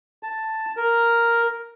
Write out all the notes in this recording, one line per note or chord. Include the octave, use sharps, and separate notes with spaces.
A5
A#4